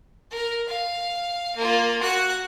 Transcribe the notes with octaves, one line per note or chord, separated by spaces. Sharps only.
A#4
F5
A#3 F4
F#4 F#6